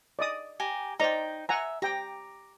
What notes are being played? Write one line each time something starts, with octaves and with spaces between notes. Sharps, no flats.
D5 D#5 D#6
G4 G#5 A#5
D#4 C5 D5 G5 A#5
E5 F#5 G#5 A#5
G4 G5 A#5 D6